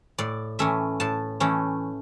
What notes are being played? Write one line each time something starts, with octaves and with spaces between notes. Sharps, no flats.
A2 D5
E3 A3 C#4 E5
A2 A5
E3 A3 C#4